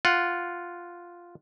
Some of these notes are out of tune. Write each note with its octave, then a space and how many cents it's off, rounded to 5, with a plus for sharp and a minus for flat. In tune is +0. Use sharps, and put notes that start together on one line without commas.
F4 +0 F#5 +0